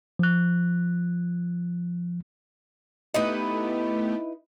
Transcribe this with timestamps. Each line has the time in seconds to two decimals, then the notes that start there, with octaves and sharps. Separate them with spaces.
0.19 F3 F#6
3.14 A3 B3 D#4 E4 G4 B4 D#5